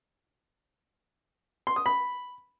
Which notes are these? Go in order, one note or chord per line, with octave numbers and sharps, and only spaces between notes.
C6
D#6
B5